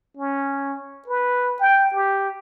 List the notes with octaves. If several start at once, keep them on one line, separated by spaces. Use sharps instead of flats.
C#4
B4
G5
G4